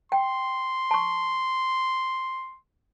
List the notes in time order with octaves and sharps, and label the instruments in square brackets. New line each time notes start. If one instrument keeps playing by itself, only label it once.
[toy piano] G5 [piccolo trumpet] C6
[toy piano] A5 C#6